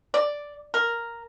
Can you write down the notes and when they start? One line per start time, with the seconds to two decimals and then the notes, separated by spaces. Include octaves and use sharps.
0.14 D5
0.74 A#4